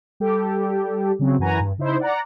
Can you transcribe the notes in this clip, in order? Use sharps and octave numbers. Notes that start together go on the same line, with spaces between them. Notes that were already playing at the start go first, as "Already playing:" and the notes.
G3 G4 A4
C#3 F#3 C4
F#2 E3 F#4 B4 G#5 A#5
G2
C#3 D#4 E4 C5
D5 F#5 A#5